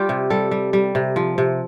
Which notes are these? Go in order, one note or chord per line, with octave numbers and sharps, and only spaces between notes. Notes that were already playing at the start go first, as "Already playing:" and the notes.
Already playing: G3 F4 G4
C3
G3 A4
G3
G3
C3
F3
C3